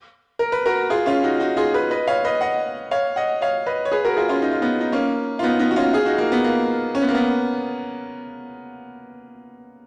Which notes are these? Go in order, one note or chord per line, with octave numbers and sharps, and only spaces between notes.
A#4
B4
F#4 A#4
F4 G#4
C#4 F4
D#4 F#4
D#4 F#4
F4 G#4
G#4 B4
B4 D#5
C#5 F5
B4 D#5
D#5 F#5
C#5 F5
D#5 F#5
C#5 F5
B4 D#5
C#5
G#4 B4
F#4 A#4
F4 G#4
C#4 F4
D#4
F4
B3 D#4
D#4
A#3 C#4
F4
B3 D#4
B3 D#4
F#4
C#4 F4
F4 G#4
D#4 F#4
A#3
B3
A#3
C#4
B3
A#3
B3